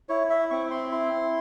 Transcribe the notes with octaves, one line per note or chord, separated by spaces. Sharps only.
E4 C#5
E5
C4 C#6
C6
E4 C6